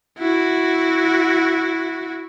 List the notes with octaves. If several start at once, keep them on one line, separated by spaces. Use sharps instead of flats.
E4 F#4